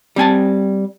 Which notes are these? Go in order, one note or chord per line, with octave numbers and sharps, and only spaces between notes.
G3 C4 G#5 A5